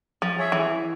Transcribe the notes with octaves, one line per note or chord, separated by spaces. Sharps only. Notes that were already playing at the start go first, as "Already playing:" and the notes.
F3
G#4 C#5 E5
E3